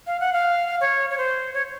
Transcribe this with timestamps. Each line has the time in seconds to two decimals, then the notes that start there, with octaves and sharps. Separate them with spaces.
0.07 F5
0.20 F#5
0.33 F5
0.81 C#5
1.10 C#5
1.18 C5
1.54 C#5